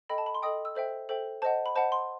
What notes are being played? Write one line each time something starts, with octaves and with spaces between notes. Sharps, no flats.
A4 D#5 G5 B5
A5
B5
C6
A4 D#5 G5 D#6
E6
A4 C5 E5 G5
A4 C5 E5 G5
C5 D#5 F#5 A5
B5
C5 D#5 F#5 A5
C6